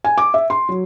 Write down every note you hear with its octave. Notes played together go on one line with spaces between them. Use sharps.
G#5
D6
E5
C6
F#3